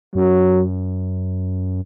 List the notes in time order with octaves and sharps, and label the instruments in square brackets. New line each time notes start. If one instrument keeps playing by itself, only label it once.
[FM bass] F#2 [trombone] F#3